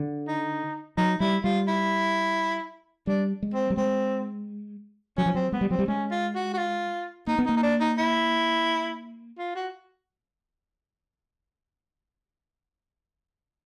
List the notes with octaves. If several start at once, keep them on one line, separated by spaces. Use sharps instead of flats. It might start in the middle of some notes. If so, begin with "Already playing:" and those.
Already playing: D3
D#4
F#3 D#4
G3 E4
G3 F4
E4
G3 D4
G#3
C4
G3
G#3 C4
F#3 C#4
F3
F#3 C4
G#3 B3
G3
F#3 C4
G3
G#3 C#4
F4
F#4
F#4
F4
A#3 D#4
B3
D#4
A#3
D#4
D4
D#4
E4
F4
F#4